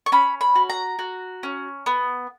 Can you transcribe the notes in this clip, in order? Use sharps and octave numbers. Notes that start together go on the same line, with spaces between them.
C#6
C#4 B5
B5
F#4
A#5
F#4
C#4
B3